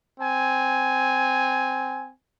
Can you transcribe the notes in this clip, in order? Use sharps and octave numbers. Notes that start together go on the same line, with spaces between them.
C4 G#5